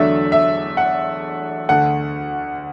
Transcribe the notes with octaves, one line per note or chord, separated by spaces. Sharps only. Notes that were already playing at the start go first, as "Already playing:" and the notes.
Already playing: E2 D3 F#3 A3 D4 E5
E5
F#5
D2 D3 A3 F#5